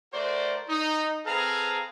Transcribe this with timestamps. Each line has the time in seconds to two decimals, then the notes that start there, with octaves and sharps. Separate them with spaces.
0.13 A3 F#4 A#4 C5 D5
0.69 D#4
1.26 C4 G#4 A4 B4 F5 A#5